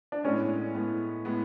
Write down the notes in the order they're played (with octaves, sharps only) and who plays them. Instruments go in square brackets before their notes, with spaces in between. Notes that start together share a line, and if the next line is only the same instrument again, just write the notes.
[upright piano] D4
[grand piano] A2 G#3 B3 [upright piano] C#4
[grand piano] A2 G#3 B3
A2 G#3 B3